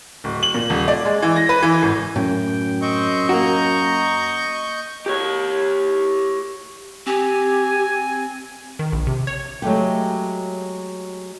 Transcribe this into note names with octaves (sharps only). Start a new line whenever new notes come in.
D1
F#7
A#2
D#1
D5
G#3
E3
A#6
B4
E3
G#1
F#2 A2 G5
C4 D#5 C#6 G6
A#3 F#4 A#5
G4 C#5
C4 G4 G#5
D#3
A#1
C3
C#5
F#3 G#3 A3 G4